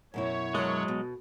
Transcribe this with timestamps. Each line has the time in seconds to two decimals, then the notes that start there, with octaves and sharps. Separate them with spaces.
0.14 F#2 B2 E4 C#5
0.55 F#3 G#3 A4 A#4 F#5
0.88 B2